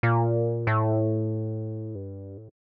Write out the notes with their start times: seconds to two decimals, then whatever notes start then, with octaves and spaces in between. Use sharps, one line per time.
0.03 A#2
0.67 A2
1.95 G2
2.37 A2